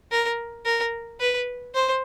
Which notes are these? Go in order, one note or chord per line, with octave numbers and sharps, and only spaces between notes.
A#4
A#4
B4
C5